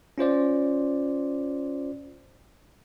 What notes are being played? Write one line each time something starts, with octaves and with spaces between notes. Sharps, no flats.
C#4 F4 C5 D5